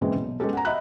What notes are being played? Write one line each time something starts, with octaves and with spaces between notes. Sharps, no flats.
A#2 C#3 E3 G#3 C4
B1
G#3 B3 C#4 G4 A4
F#5 G#5 A#5
D#5 E5 F#5 B5 F#6